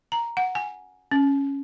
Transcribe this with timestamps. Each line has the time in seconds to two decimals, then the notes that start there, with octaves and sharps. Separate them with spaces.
0.12 A#5
0.37 F#5
0.55 G#5
1.11 C#4